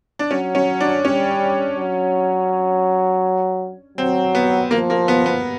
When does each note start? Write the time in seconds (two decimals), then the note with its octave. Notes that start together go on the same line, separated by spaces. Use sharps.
0.19 D4
0.31 F#3 C#4
0.55 C#4
0.80 D4
1.05 G3 C#4
1.77 F#3
3.98 F#3 C4
4.35 B3
4.71 F3 A#3
4.90 A#3
5.08 B3
5.26 B3